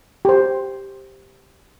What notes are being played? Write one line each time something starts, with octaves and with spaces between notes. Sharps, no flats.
G4 C5